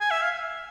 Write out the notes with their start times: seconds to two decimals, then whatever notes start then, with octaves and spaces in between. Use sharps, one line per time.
0.01 G#5
0.11 E5
0.22 F5